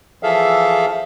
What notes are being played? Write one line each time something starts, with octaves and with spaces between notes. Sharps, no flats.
E3 F3 G#4 A4 E5 F5